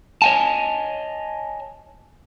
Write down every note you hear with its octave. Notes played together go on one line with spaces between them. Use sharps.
C#5 D#5 F#5 G#5 A5